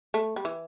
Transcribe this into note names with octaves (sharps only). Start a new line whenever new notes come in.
A3
G3
E3